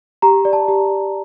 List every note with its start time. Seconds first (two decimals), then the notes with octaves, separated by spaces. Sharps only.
0.22 G4 A#5
0.45 D5
0.53 A5
0.68 G4